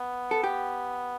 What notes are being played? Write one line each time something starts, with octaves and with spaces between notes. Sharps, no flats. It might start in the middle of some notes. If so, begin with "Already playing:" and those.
Already playing: B3
A4
G4